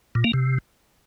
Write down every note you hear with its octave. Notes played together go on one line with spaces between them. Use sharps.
A#2
A#3
C3